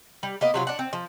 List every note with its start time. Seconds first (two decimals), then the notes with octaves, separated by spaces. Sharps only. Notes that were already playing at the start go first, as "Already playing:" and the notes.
0.23 G3
0.41 A#3 B3 D#5
0.54 C3 F#3 F4
0.67 D4 F#5
0.79 C4
0.93 F3